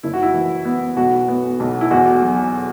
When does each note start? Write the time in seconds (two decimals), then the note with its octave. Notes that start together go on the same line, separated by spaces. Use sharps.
0.03 F#1 E4
0.13 F#4
0.23 E4
0.34 E3
0.65 B3
0.97 B1 F#4
1.28 B3
1.60 B1
1.81 E4
1.91 E2 F#4
2.22 F#3